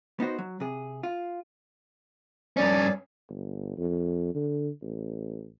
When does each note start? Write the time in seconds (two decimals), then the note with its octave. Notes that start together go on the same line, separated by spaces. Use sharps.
0.20 B3 D#4 F#4 C5
0.38 F#3
0.60 C3 G#4
1.03 F4
2.57 G2 C#4 D5
3.29 G1
3.78 F2
4.35 D3
4.82 A1